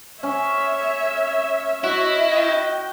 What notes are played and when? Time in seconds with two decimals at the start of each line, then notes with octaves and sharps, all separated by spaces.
0.23 C#4 C#5 E5
1.84 E4 F#4 D#5
2.32 G5